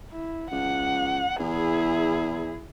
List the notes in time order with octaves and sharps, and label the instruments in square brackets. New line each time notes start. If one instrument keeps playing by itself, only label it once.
[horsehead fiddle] E4
[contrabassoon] C#2 [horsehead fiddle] F#5
[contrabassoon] E2 [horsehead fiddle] E4 G#4